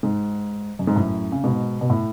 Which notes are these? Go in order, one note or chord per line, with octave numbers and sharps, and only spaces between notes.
G#2
F#2
G#2
F#2 A2
C#3
G#2 B2
B2
A2